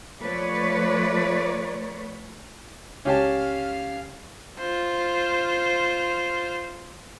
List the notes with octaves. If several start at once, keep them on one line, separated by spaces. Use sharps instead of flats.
F3 A3 B4 C#5 D5
C#2 C#4 G4 F5 A5
F4 C5